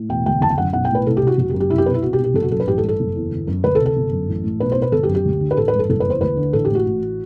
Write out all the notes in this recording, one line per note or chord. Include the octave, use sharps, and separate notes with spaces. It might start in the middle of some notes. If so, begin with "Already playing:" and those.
Already playing: A2
E1 G5
D2 G5
F#1 A5
G5
F#2 F#5
B1 F#5
G5
A2 B4
C2 A4
G4
C3 F#4
F#1 F#4
G4
F#2
G4
C2 E4
G4
B2 B4
E4
C2 F#4
G4
B2
G4
F#1 A4
F#4
F#2 A4
B4
A1 G4
A4
G2
A4
F#1
E2
G1
F#2
D2 B4
A4
C3
A4
G1
F#2
A1
A2
B1 B4
C5
B2 B4
G1 A4
G4
F#2
G4
D2
D3
B4
A1 A4
B4
G2
A4
F#1 A4
B4
E2 C5
D2 B4
D3
A1 A4
A2 G4
F#4
A1